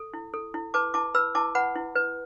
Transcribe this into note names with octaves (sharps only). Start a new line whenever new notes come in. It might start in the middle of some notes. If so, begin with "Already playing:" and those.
Already playing: A4
E4
A4
E4
B4 A5 D6
E4 A5 D6
B4 B5 E6
E4 A5 D6
B4 F#5 B5
E4
B4